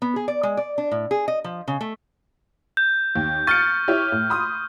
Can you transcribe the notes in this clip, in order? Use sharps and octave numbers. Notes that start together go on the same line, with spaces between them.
B3
G#4
D5
G#3
D5
D4
A2
G#4
D#5
F3
C#3
A3
G6
D#2
C#6 F6 A6 C#7
E4 G4 C#5
A2
B5 C6 D#6